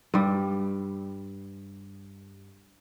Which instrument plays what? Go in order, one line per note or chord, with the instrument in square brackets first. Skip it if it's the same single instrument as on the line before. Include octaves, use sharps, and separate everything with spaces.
[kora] G2 G3